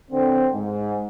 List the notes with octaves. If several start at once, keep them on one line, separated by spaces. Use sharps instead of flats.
D3 C4
G#2